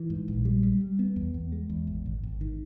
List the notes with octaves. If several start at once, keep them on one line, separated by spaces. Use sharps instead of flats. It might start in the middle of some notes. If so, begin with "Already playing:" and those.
Already playing: E3
G#2
A#1
G3
G3
G3
B3
E2
E2
G#3
E2
G#1
G#1
G#1
D#3